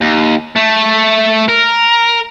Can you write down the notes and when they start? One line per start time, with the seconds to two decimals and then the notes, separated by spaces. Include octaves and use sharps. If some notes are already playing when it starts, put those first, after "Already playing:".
0.01 D#2
0.56 A3
1.48 A#4